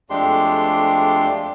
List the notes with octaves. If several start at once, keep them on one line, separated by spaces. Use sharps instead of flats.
F2 G#3 A3 D4 G4 C6